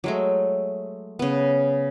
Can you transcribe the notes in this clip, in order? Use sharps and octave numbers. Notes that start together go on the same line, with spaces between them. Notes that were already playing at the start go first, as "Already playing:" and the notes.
F#3 G#3 A3
C#3 B3